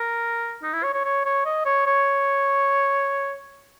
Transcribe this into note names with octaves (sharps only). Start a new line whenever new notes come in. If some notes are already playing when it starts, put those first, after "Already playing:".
Already playing: A#4
D#4
E4
C#5
C#5
C#5
C#5
D#5
C#5
C#5